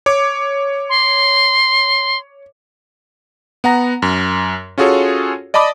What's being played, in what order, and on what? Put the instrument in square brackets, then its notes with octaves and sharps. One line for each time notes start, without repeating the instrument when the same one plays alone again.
[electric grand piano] C#5 D6
[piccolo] C6
[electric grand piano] B3 F#5 A#5 A#6
F#2
C#4 F4 F#4 G#4 A4 C#5
D5 D#5 A5 B5 D6 D#6